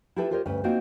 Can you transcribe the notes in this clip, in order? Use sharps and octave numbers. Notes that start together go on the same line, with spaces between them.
E4 F4 G4 A4 B4 E5
F4 G4 A#4 C5 C#5 D#5
D2 G2 C#4 B4
A#3 C4 D#4 F4 F#4 C5